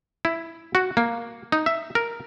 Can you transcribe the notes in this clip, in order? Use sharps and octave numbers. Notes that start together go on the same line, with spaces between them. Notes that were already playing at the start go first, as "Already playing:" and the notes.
E4
F#4
A#3
D#4
E5
A#4